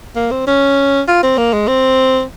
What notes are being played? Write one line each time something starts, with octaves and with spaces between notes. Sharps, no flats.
A#3
C4
C#4
F4
C4
A#3
G#3
C4